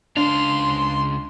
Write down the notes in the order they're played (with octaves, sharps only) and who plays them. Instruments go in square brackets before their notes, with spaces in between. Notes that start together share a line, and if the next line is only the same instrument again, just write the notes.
[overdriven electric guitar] C#2 F5 [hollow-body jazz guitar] D4 [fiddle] C6